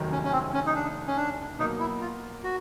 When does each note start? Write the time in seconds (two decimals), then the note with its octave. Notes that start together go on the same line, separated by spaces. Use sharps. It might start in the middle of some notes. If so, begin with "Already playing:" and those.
Already playing: F1 D#2 D#3 F#3
0.12 C#4
0.24 C#4
0.32 C4
0.53 C#4
0.66 D#4
0.75 D4
1.07 C#4
1.17 D4
1.59 B2 F#3 A#3 D#4
1.80 E4
2.01 F4
2.44 F#4